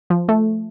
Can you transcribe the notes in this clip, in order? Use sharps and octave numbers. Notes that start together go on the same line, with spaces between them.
F3
A3